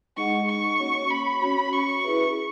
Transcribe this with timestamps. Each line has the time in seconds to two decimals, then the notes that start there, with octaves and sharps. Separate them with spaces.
0.17 G#3 D#4 G#4 D#5 F#5 C#6
0.48 C#6
0.80 A#3 C#4 F#4 C#5
1.10 B5
1.41 C#4 F#4 C#5
1.73 C#6
2.04 E4 G#4 B4 E5